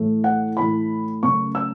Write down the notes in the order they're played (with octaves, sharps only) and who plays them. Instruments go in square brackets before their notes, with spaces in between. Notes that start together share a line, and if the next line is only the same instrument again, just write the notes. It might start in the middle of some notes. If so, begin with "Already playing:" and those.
Already playing: [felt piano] A2 E3 A3
F#5
A2 E3 A3 B5
F#2 C#3 A3 C#6
E6